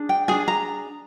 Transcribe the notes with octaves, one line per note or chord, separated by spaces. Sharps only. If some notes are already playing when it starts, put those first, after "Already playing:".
Already playing: D4 G#4
G5
D4 G#4 G#5
A#5